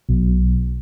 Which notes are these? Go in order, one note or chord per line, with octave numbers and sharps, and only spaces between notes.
B1